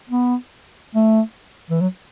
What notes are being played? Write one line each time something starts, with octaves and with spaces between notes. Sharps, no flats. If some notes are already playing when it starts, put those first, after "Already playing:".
B3
A3
E3
F#3